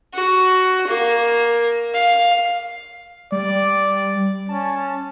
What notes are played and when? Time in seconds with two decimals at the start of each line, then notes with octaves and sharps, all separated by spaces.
0.14 F#4
0.87 A#3
1.94 F5
3.32 G3 D5
4.49 C#4 A5